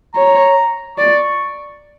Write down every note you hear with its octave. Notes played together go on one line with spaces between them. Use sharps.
C#5 A#5
D5 C#6